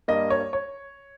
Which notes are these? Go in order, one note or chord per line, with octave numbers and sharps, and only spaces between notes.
G2 G3 A#3 D#5
C#5
C#5